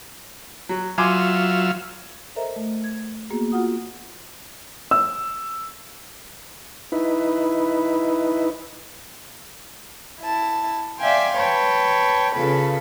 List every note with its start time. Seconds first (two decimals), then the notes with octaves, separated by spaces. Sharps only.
0.69 F#3
0.98 F#3 F4 E5 G#5 C6 D6
2.36 A4 A#4 C5 D#5 E5 A#5
2.56 A3
2.84 G#6
3.30 A#3 B3 F#4 G#4
3.52 F4 F#4 F#5 D#6
4.91 E6
6.92 D#4 E4 B4
10.22 E4 A5
11.00 D5 E5 F5 G5 G#5 C6
11.37 B4 C#5 G5 A5
12.34 C#3 F4 A4 B4